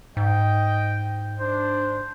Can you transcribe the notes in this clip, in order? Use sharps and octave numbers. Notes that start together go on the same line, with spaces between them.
G#2 D#5 G5
D4 C5